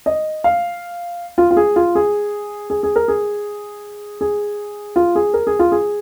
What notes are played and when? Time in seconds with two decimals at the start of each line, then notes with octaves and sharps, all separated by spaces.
0.06 D#5
0.44 F5
1.38 F4
1.51 F4
1.57 G#4
1.76 F4
1.95 G#4
2.70 G#4
2.83 G#4
2.96 A#4
3.08 G#4
4.21 G#4
4.96 F4
5.15 G#4
5.34 A#4
5.47 G#4
5.59 F4
5.72 G#4